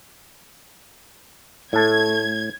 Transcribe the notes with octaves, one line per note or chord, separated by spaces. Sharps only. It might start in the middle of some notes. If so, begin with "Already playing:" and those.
A2 A3 A5 G#6